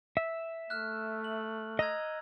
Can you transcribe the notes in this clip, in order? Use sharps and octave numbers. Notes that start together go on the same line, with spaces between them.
E5
A3 F6 F#6
F#7
D#5 A#5 E6 G#6